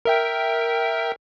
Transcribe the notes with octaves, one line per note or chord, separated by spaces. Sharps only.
A#4 E5 G5